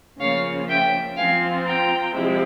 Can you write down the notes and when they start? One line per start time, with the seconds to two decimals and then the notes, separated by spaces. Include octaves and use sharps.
0.19 C#3 F3 A#3 C#5 F5
0.68 E5 G5
1.16 F3 C4 F4 F5 G#5
1.65 G5 A#5
2.14 C3 F3 G#3 C4 E4